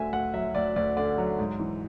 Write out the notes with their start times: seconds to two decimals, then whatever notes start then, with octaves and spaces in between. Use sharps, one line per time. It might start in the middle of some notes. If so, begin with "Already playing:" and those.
Already playing: D2 D3 E5 G#5
0.13 D2 F#5
0.34 F#3 E5
0.55 D2 D5
0.76 D2 D5
0.96 D3 D5
1.18 F#3
1.39 G#2
1.59 E3